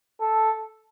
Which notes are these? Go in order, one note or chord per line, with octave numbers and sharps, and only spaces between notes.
A4